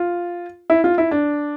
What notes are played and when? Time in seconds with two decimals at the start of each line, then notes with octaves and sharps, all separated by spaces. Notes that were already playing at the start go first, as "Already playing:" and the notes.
Already playing: F4
0.70 E4
0.84 F4
0.98 E4
1.11 D4